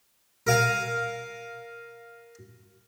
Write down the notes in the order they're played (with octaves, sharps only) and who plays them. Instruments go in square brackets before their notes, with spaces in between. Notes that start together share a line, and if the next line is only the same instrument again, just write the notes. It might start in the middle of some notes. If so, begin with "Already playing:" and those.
[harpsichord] A#4 F5 G#5